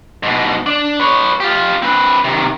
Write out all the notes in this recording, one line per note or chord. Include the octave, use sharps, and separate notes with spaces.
G#2 B2
D4
B4 C#5
F4 G4
C4 B4
C3 D#3